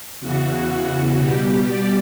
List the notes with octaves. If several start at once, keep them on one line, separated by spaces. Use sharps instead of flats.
E2 C#3 E3 F#4
B2 G3 G4
D5